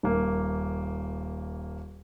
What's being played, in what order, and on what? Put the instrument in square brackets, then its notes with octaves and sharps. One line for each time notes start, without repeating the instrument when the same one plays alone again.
[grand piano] D#1 A#3